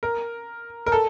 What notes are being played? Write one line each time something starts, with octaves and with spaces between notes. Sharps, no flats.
A#4
A#4
A4